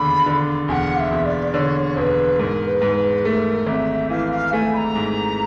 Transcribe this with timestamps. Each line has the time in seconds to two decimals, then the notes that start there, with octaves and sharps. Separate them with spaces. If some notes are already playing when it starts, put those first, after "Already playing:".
Already playing: E1 D#2 D3 B5
0.26 D3
0.68 E1 G#5
0.72 F#5
0.97 F5
1.00 E5
1.11 E1
1.26 D5
1.54 D3 C#5
1.96 E1 B4 C5
2.39 G#2 A#4
2.67 B4
2.82 G#2
2.96 B4
3.25 A3 A#4
3.67 G#1 E5
4.10 E3 F5
4.32 F5
4.53 A3 G#5
4.73 B5
4.77 A#5
4.95 G#2